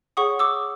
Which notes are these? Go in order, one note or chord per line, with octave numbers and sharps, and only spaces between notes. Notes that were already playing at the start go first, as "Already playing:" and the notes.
G#4 C#5 F#5 C#6 D#6
D6 E6